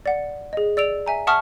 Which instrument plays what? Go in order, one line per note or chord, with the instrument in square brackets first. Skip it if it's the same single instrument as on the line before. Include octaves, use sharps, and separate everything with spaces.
[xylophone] D5 F#5
G#4 D#5
D5 E6 D7 F7
E5 G#5 A#5
E5 F#5 A5 C#6 D#6 F6